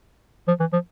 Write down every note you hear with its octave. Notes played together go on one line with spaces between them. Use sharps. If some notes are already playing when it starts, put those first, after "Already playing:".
F3
E3
F3